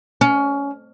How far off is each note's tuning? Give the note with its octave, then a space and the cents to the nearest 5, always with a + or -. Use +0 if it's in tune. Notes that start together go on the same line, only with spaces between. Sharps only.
C#4 +20